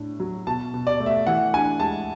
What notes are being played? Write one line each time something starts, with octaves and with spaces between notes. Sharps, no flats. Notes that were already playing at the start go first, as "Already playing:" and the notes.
Already playing: A2 D4
F#3
B2 A5
B2
D5
A3
E5
E3 F#5
D4 G#5
G#3 A5